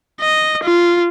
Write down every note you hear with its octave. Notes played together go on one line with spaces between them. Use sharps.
D#5
F4